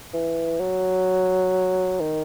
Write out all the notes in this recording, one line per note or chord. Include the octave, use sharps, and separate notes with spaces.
E3
F#3
D#3